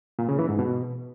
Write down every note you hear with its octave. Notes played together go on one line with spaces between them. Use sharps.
A#2
C#3
E3
G#2
B2